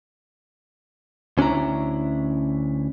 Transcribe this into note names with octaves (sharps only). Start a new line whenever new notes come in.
D2 C#4 D4 E4 A#5